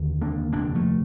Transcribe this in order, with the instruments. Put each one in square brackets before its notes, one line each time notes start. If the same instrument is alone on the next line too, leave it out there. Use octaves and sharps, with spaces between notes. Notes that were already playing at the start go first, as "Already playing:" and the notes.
Already playing: [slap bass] F1 D#2 D3
A#3 D4
F1 D#2 D3 A#3 D4
F3 A3